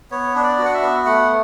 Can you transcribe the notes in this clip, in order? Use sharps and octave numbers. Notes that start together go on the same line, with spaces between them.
B3 C#5
D4
D5
F#4
F#5
E5
B3
A3 F#5